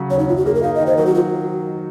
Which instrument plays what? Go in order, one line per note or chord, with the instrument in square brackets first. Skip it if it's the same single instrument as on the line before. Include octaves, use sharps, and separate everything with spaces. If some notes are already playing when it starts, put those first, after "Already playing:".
Already playing: [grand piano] C#3 F#3
[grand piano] D#2 [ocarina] C#5
[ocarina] D#4
[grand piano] F#2 [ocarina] F4
[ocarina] F#4
[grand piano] A#3 [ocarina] G#4
[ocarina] A#4
[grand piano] D#4 [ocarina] F5
[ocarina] D#5
[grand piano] D#3
[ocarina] C5
[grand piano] F#3 [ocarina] A#4
[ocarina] F#4
F4